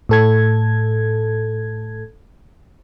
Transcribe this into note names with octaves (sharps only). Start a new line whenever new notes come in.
A2 A4 G#6